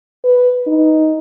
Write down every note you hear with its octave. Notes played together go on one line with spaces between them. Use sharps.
B4
D#4